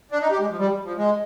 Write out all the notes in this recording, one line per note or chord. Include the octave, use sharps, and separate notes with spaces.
D4
D#4
G4
G#3
F3
G3
F3
G#3